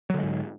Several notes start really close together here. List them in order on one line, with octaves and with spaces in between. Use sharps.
F#3 D3 G#3 G#2